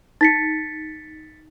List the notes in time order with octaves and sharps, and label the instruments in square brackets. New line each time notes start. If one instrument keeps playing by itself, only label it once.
[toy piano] D#4 [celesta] A6 B6 C#7